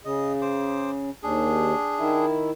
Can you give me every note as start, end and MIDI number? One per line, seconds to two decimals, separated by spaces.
0.05 1.10 49
0.05 0.33 75
0.41 0.91 72
0.41 0.91 86
1.23 1.73 39
1.23 2.26 62
1.23 2.26 68
1.99 2.51 51
1.99 2.51 64